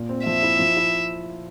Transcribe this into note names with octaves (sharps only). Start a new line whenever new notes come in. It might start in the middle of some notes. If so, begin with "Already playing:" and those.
Already playing: A#2
C4
F3 E5
E4
F3
E4